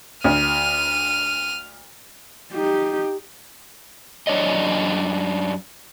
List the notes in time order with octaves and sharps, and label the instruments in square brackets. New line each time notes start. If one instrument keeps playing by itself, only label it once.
[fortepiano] D2 [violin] F6 D#7
[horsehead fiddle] D#4 G4
[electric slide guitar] F#2 D4 C#5 D#5